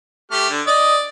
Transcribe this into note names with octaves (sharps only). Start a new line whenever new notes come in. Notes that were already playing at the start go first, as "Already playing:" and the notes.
A3 G4 F6
D3
D5 D#5